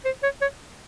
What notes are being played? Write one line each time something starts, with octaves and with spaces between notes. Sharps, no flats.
C5
C#5
C#5